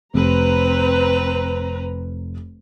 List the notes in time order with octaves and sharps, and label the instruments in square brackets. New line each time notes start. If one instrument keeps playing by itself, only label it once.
[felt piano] F1 [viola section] C4 B4 A#5